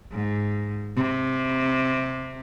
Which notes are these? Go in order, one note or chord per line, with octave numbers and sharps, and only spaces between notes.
G#2
C3